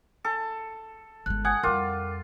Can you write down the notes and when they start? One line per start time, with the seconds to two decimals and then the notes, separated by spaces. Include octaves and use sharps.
0.24 A4
1.26 G1 G#3 F#6
1.45 F#5 G#5 D#6 G#6
1.63 F2 G3 F4 A#4 G5 D6